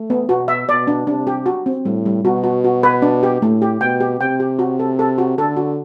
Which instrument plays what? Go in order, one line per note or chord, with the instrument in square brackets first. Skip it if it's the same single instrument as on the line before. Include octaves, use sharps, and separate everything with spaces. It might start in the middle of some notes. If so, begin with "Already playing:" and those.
Already playing: [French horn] A3
[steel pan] B3
[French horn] B2 [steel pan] F#4
[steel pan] E5
[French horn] B2 [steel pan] D5
[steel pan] D4
[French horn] C3 [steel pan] D4
[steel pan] G4
F#4
C4
[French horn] A2 [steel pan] G3
[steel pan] G3
[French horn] B2 [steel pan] F#4
[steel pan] F#4
F#4
B4
D4
G4
[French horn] A2 [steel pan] A3
[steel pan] G4
[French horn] B2 [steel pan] G5
[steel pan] G4
[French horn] C3 [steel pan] G5
[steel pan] G4
F#4
A4
A4
F#4
[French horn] D3 [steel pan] A4
[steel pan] F#4